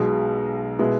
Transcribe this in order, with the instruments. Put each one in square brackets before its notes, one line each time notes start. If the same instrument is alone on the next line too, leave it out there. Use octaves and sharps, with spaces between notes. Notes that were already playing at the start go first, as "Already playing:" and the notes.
Already playing: [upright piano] B1 B2 G#3
B2 G#3 B3 E4